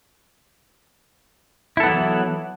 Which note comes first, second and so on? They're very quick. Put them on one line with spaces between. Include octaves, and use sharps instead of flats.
E4 A4 B3 F#3 E3